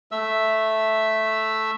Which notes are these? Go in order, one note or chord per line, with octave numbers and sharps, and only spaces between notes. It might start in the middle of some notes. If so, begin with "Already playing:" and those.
A3 E5 E6